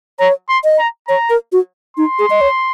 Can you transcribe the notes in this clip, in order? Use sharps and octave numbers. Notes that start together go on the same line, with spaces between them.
C#5 A#5
C6
D#5
A#5
C#5 A#5
A#4
F#4
D#4 C6
G#4
D#5
C#5